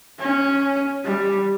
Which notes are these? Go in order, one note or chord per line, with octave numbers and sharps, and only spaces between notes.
C#4
G3